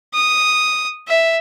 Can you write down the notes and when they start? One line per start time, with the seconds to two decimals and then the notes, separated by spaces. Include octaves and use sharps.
0.14 D#6
1.08 E5